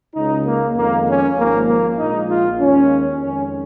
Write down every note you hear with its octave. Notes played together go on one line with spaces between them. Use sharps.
C#2 C#3 G#3 D#4
A#3
F2 D#3 G#3 A#3
C#4
G#1 G#2 F3 G#3 A#3
A#3
A#1 A#2 G#3 D#4
F4
D#2 D#3 G#3 C#4
F2 D#3 G#3 C#4